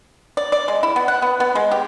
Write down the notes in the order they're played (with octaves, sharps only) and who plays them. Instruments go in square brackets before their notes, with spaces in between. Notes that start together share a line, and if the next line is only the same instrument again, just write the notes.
[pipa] D5
D5
G#3
E4
B3
F#5
B3
B3
G#3
G4